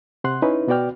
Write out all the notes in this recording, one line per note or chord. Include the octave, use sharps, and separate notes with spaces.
C3 F#5 C6 F#6
C#4 D#4 E4 B4
B2 B3 F#4 D5 G5 F6